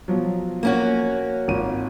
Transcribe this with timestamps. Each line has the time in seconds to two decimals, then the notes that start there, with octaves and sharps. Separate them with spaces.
0.08 B2 F3 F#3
0.63 A#3 C#4 F#4
1.48 G#1 F4 D#7